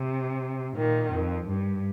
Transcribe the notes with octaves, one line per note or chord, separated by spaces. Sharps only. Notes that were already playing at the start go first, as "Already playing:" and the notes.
Already playing: C3
A#2 D#3
F2
G2